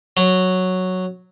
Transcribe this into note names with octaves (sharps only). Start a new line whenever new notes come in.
F#3